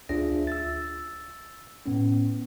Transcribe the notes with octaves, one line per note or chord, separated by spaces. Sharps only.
D2 D4 F4 G#4 E5 A#6
E6 A6
A2 B3 C#4